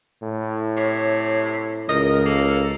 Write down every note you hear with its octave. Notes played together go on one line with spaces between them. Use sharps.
A2
C3 C#5
C#2 A#4 D#5
A#3 A4